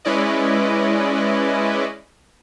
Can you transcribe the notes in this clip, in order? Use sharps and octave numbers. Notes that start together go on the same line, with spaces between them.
G#3 C#4 E4 B4 D5 D#5